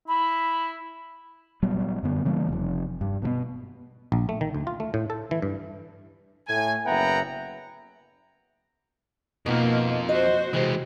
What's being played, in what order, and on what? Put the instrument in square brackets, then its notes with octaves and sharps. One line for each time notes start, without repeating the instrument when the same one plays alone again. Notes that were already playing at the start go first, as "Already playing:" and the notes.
[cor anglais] E4 [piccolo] B5
[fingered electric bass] A#2 F#3 G3 B3
F#2 D3 B3
C#3 E3 G3 A#3
F1 F2
G2
B2 F3 B3
[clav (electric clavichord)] A#1
A3
D#3
D2
F4
A3
A2
A4
E3
G2
[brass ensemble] A2 G#5
F#1 B3 E5 F#5 G5 A#5
[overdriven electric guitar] F2 F3 [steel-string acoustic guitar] B2 D#4 [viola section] A#3
[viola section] F#4 C5 [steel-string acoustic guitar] D#5
[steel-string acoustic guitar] C3 [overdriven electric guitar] E3 G#3